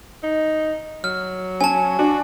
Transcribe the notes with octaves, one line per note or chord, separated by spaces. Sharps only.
D#4
F#3 F6
C#4 G#5 A5
D4 F#4